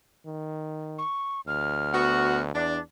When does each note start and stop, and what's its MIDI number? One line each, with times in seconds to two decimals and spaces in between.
0.26 1.02 51
0.98 1.41 85
1.47 2.51 38
1.47 2.40 89
1.93 2.42 59
1.93 2.42 66
2.55 2.79 40
2.55 2.79 62
2.55 2.80 93